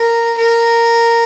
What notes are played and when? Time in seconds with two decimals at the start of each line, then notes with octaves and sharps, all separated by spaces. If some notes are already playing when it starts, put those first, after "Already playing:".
Already playing: A#4
0.38 A#4